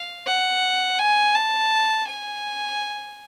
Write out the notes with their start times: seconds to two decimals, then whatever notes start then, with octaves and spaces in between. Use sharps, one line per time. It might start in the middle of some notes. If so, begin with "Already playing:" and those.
Already playing: F5
0.26 F#5
0.99 G#5
1.35 A5
2.07 G#5